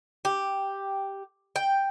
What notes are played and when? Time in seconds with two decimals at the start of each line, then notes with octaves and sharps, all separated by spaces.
0.25 G4
1.56 G5